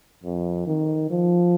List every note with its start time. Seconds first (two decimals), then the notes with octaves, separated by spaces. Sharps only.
0.24 F2
0.67 D#3
1.10 F3